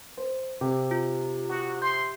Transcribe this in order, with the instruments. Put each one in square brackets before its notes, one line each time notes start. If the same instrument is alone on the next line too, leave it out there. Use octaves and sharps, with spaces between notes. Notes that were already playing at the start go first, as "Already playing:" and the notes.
[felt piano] C5
[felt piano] C3 [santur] G4
[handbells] F4
[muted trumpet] F#4 [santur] D#5 A#5
[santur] E5 [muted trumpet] C6 [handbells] G6